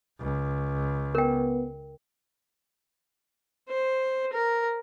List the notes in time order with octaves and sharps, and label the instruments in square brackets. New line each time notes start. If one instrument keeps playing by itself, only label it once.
[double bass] C#2
[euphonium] B3 [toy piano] A#4 G5
[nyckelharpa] C5
A#4